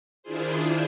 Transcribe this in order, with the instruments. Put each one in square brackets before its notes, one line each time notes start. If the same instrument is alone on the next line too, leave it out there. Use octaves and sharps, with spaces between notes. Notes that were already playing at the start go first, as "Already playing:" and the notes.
[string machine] D#3 D4 E4 F4 G#4 C5